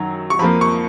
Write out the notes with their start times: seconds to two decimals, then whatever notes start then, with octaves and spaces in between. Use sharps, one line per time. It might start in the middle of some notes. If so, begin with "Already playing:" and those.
Already playing: F#2 D#3 F#3 A#5
0.30 C#6
0.39 F2 F3 A#3 B5
0.61 C#6